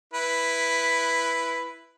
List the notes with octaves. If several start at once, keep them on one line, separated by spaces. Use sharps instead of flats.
E4 B4